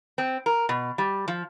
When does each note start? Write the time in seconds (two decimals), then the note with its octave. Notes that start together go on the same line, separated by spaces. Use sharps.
0.18 C4
0.46 A#4
0.69 B2
0.98 G3
1.28 F3